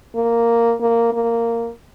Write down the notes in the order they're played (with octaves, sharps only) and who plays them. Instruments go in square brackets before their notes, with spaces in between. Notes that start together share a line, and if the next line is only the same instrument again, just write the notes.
[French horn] A#3
A#3
A#3